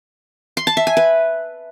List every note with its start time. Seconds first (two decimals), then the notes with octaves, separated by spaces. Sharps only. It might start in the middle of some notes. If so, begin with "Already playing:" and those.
0.57 C6
0.67 A5
0.77 E5
0.87 G#5
0.97 B4